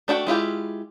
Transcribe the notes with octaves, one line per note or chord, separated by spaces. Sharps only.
A3 D4 F#4 G5
G#3 E4 F4 G4